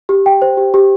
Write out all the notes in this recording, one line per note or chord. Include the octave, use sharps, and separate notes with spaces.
G4
G5
C5
G4
G4